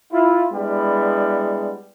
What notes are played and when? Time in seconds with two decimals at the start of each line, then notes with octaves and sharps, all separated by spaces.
0.13 E4 F4
0.53 G3 G#3 B3 D4 E4